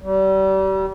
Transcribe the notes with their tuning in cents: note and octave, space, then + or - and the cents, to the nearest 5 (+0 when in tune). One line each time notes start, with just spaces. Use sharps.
G3 -35